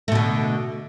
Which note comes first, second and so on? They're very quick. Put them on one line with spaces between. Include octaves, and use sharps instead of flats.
A3 B2 D3